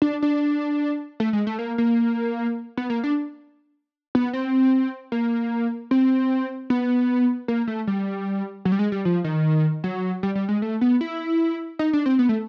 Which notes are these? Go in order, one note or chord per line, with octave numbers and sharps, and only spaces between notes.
D4
D4
A3
G#3
A3
A#3
A#3
B3
A#3
D4
B3
C4
A#3
C4
B3
A#3
A3
G3
F#3
G3
G#3
G3
F3
D#3
F#3
G3
G3
G#3
A3
B3
E4
D#4
D4
C4
B3
A3